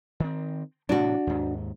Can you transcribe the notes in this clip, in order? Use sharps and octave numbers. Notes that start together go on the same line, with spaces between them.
D#3 C4
A2 C3 E3 D4 F#4
D#2 G#2